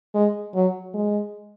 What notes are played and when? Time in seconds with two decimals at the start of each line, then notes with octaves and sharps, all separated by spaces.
0.14 G#3
0.55 F#3
0.94 G#3